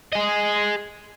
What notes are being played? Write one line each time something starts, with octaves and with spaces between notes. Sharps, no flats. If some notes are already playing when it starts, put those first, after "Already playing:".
G#4 D#5